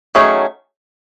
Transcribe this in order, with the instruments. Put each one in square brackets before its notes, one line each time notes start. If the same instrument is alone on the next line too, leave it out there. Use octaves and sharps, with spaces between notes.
[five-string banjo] D#3 F#3 A3 C#4 G#4